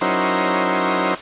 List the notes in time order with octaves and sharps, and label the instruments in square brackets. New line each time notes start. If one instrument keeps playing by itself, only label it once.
[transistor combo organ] F#3 C#4 D#4 E4 A#4 C5